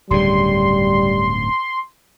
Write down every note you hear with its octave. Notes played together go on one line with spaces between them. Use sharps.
D1 G2 C#3 G3 C6